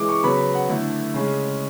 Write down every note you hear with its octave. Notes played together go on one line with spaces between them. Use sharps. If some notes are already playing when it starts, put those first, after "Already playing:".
Already playing: E3 G#3 D6
C#6
C#3 F#3 B3 B5
F#5
D3 A3 E4
C#3 G#3 C#4